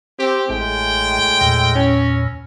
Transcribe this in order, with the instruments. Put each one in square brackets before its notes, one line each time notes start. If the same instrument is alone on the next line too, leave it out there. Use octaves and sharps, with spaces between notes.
[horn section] C4 G4
[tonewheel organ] A1 [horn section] A2 G#3 G5
[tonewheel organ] E2 A#2
[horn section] C#4